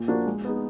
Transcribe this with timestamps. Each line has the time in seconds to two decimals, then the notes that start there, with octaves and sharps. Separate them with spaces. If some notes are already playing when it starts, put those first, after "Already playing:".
Already playing: A#2
0.08 F3 A#3 D4 F#4
0.26 G#3
0.45 B3 D#4 G#4